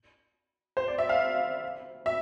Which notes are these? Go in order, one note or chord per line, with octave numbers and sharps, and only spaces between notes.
C5
D5
E5
F5
E5